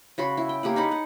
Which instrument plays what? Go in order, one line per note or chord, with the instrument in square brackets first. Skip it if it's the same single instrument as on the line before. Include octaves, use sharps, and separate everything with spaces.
[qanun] C#3 F#4 B5 C6
E4
G5
A#3 G4 G#4 F#5
D#4 F#5 B5
F#5